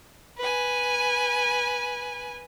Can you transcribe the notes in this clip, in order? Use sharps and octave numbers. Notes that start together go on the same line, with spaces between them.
B4 G#5